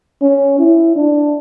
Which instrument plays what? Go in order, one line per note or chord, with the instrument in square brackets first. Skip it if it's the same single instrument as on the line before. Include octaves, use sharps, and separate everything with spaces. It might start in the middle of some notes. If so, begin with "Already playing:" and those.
[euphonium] C#4
E4
D4